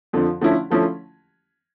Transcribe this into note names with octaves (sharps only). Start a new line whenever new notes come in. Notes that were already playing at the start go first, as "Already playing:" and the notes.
F2 D3 F3
D3 F3 A3 C#4 E4
D3 F3 A3 C#4 E4